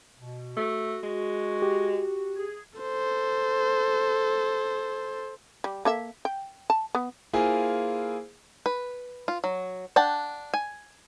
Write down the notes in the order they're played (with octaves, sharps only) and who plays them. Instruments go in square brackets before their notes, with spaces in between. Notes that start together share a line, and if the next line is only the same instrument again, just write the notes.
[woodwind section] B2
[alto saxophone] A3 [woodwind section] F#4
[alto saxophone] G#3
[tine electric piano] G4
[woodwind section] G#4
[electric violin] A4 C5
[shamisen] G3
A#3 A4 E5
G5
A5
B3
[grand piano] A#3 E4 F4 G#4 C5 G#5
[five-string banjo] B4
F4
F#3
D4 F#5 G5 A5
G#5